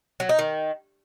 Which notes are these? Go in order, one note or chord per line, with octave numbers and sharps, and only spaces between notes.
F#3
D#4
D#3